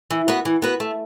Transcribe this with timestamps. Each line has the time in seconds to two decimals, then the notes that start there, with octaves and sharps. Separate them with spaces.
0.11 E3
0.28 B3 F#4 B4
0.45 E3
0.62 B3 F#4 B4
0.80 A3